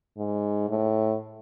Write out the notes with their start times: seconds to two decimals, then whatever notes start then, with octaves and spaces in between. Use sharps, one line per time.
0.17 G#2
0.69 A2